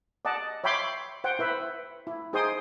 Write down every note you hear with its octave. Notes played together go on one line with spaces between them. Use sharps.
D5 D#5 F#5 A5
C#5 E5 G5 B5 C6 D6
C5 F#5 G5
E4 B4 E5
E4
D#4 G#4 C5 G5 C6 D#6